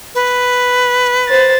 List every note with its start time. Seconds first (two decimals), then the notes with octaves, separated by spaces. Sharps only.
0.15 B4
1.28 C5 A6